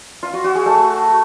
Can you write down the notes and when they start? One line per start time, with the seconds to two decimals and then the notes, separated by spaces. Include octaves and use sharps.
0.23 F4
0.33 F#4
0.44 F#4
0.55 G#4
0.66 A3